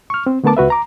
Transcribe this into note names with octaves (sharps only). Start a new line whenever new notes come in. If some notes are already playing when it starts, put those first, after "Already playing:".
C#6 F6
C4
D3 A3 B3 A#4 A5 D6
C#2 F#4 B4 E5
A#5 D6